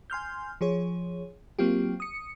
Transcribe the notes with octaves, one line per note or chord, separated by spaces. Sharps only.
G#5 C6 F6 G6
F3 G#4 C#5
F#3 A#3 C4 F4 G4
D#6 C#7